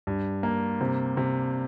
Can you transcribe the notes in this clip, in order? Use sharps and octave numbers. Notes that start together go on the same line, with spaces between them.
G2
A#3
C3
C3